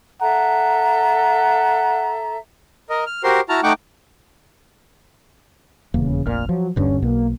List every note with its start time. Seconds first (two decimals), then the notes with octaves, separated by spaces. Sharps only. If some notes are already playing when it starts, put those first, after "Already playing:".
0.21 A4 E5 F#5 A#5
2.90 A#4 D#5
3.06 F6
3.24 F#4 G4 A#4 C5 C6
3.49 E4 F#4 A5 A#5 F6
3.63 A3 D#4 F#5 G5 C#6 D6
5.94 D#1 E2 C#3 A#3
6.26 F1 A#1 A#2 F6
6.49 F3 F#3
6.76 D#1 G2 D3 C#4
7.02 B1 B2 A#3